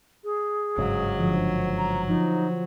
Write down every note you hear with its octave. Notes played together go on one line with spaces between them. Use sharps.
G#4
G1 G#2 C#3 F#3
D3 F3
A#5
F3 D#4